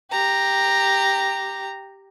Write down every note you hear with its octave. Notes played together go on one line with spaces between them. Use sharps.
G4 A#5